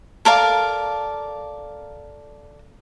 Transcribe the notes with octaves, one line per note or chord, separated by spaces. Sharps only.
A4 A#4 D5 F5